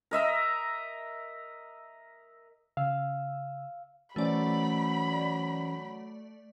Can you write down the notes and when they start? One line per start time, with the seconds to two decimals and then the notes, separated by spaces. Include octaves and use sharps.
0.11 A#4 D#5 E5 A#5
2.77 C#3 F5 E6
4.16 E3 F#3 A3 C#4 C5 D5 B5